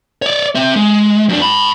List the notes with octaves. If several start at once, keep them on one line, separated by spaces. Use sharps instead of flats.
C#5 D5
C4 E5
G#3
F#2 D4
A5 B5